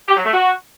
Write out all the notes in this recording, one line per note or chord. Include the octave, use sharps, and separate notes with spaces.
G4
F#3
A3
F#4